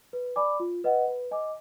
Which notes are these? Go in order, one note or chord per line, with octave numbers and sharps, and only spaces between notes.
B4
D5 G#5 B5 D6
F4
B4 D#5 F#5
B4
D#5 G#5 D6